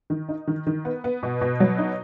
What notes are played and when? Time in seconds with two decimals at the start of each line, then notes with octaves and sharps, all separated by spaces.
0.10 D#3
0.29 D#4
0.47 D#3
0.67 D#3
0.85 B3
1.04 B3
1.23 B2
1.41 B2
1.60 F#3
1.78 D#4